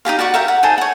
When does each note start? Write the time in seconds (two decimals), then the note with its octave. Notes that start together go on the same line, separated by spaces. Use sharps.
0.05 D#4 F4 G4 F5
0.19 F#4 D5 F#5 C#6
0.34 G4 A#4 E5 F5
0.48 F#5
0.63 D#4 G#4 A4 C5
0.78 C#5 F#5